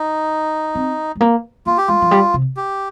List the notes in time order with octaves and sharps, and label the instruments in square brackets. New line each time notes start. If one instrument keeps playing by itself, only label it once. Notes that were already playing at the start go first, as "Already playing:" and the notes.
Already playing: [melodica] D#4
[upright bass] C4
G#3
A#3
[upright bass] A#3 [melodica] F4
[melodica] G4
[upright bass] G#3 [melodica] F4
[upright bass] F3
G3
C3
[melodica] G4